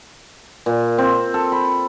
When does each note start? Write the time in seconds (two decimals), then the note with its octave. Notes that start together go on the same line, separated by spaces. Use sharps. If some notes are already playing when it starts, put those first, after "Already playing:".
0.66 A#2
0.98 C4
1.34 A4
1.52 B5